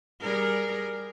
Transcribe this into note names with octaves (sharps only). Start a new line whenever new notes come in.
G3 G#4 A#4